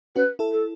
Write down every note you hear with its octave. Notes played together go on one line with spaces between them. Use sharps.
C#4 F#4 B4
E4 A4
A4